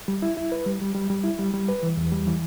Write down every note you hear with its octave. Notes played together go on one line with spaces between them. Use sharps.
G3
E4
E4
B4
G3
G3
G3
G3
E4
G3
G3
B4
E3
E2
G3
E3